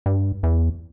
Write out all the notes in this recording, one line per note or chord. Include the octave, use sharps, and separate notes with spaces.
G2
E2